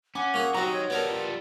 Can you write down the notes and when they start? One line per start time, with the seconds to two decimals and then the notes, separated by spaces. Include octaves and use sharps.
0.15 C#4 F#5 G#5 D6
0.34 A#3 F#4 G#4
0.54 D#3 F#3 C4 F#4 A#5
0.72 C#5
0.90 G3 B3 A4 A#4
1.10 F4